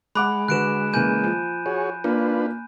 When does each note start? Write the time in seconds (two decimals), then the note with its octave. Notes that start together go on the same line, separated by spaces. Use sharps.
0.15 G#3 F#5 B5 D6 F#6
0.48 D3 F#4 B4 F#6 D7 E7
0.93 C#3 E3 A#3 G#5 G6 D#7
1.24 F3
1.66 F#4 G#4 C#5
2.04 A#3 D4 F4 B4